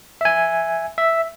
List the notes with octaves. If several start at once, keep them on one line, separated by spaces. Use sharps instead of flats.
E5 G#5
E5